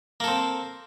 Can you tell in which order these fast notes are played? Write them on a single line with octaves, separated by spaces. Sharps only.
A#3 A4 C4